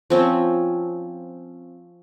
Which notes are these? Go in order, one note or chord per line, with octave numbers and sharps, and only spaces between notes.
F3 C4 C#4